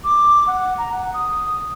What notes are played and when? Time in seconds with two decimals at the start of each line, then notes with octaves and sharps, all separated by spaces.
0.04 D6
0.47 F#5
0.78 A#5
0.92 F#5
1.14 D#6